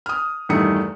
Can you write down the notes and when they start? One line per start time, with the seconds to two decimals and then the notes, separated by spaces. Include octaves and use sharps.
0.06 D#6 F6
0.49 E2 G2 D#3 A3 D#6 C#7